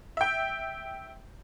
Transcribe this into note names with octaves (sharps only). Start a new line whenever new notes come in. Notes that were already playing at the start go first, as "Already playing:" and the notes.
E5 G5